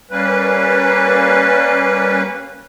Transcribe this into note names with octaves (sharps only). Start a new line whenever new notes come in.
G3 A#3 C#4 B4